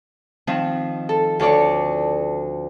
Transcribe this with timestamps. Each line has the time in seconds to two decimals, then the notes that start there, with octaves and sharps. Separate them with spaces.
0.47 D#3 F3 C4
1.09 A4
1.39 D2 A4 C#5 D5 C#6